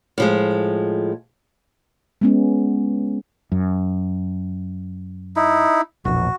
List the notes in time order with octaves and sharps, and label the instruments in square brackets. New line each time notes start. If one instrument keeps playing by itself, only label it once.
[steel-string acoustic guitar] A2 F3 G#3
[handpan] G#3 B3 C#4
[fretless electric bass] F#2
[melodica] D#4 E4
[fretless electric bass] E1 A#1 [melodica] F#4